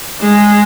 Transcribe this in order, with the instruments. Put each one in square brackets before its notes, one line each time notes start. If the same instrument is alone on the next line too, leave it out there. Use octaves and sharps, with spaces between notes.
[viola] G#3